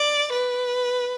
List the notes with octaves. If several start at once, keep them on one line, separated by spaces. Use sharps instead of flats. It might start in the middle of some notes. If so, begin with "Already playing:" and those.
Already playing: D5
B4